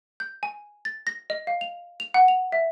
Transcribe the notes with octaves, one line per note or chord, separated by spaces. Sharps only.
G6
G#5
A6
A#6
D#5
F5
F7
F7
F#5
F7
E5